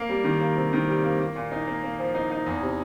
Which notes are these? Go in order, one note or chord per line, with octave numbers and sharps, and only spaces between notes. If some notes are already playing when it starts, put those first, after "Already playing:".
Already playing: A#3
G3
D#3
A#3
C3
D#3
G3
A#3
A#3
A#2
D#4
A#3
A#3
F3
D#4
D#4
E2
C3